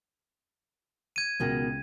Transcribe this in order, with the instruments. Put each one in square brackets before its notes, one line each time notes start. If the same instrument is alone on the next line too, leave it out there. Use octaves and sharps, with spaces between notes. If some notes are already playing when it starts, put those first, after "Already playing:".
[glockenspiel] G#6 D#7
[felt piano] C#2 G5 A#6 [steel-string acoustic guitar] B2 D#3